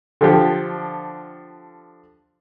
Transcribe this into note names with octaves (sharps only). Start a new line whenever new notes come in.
D3 F3 G4